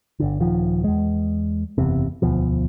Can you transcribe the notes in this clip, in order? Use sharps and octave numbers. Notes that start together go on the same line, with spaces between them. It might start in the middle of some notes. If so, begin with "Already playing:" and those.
G1 D3
D#1 D#3 F3
E2 G#3
F#1 E2 C3
E1 D2 B2 F3